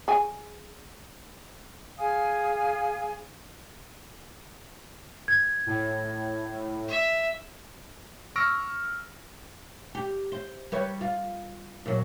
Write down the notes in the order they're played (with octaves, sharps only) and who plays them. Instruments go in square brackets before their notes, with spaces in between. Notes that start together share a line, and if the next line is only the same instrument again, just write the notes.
[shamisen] G#4 G#5
[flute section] G#4 F5 G#5 D#6
[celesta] G#6
[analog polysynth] A2
[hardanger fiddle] E5
[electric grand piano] C#6 E6 F6 A#6 D7
[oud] G4
C5
G3 B4 C#5
F4
A#2 F#3